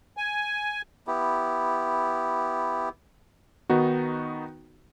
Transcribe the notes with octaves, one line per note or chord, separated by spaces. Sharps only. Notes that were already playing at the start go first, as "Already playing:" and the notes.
G#5
B3 E4 G4
D#3 B3 D#4 F#4